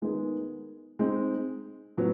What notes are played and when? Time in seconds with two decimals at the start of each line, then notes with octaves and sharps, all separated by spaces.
0.02 D#3 G#3 B3 D#4 G#4
0.99 G#3 C4 D#4
1.97 A2 F#3 B3